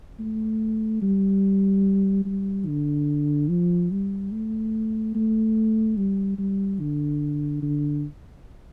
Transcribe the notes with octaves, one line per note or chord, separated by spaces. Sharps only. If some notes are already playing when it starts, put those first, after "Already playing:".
A3
G3
G3
D3
F3
G3
A3
A3
G3
G3
D3
D3